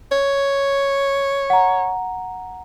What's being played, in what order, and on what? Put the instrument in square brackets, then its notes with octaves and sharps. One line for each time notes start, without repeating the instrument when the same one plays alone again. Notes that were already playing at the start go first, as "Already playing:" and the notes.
[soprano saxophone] C#5
[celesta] F#5 A#5